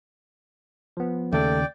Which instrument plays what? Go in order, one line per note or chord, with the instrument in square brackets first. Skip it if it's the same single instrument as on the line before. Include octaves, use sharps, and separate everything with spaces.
[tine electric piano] F3 B3
[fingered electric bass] D#2 C#3 [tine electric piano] A3 A4 [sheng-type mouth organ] D5 G5